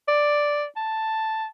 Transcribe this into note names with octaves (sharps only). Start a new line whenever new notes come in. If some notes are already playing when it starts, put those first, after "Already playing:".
D5
A5